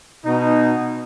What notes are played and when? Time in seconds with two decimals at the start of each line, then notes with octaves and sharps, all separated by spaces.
0.25 B2 D#4